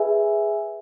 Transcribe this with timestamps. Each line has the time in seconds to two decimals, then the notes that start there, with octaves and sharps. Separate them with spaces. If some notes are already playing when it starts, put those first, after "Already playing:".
Already playing: G#4 B4 E5 G#5